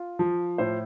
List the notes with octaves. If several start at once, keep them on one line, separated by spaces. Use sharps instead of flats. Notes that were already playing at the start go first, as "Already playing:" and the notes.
Already playing: F4
F3
A2 C5